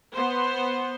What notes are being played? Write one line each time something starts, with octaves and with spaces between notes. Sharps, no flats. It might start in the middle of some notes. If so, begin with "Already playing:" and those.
B3 C5